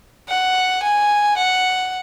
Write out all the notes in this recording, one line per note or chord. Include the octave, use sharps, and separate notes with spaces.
F#5
G#5
F#5